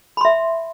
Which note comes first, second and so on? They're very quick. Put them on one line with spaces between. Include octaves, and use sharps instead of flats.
B5 C6 E5